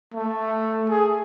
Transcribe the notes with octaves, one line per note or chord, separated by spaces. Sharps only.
A3
G#4